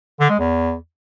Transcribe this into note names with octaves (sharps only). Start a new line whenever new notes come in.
D3
G#3
E2